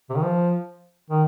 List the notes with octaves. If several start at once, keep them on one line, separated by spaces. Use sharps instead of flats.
C3
D#3
F3
D#3